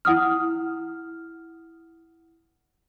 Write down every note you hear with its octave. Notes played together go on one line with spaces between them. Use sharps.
E4 F#5 D#6 F6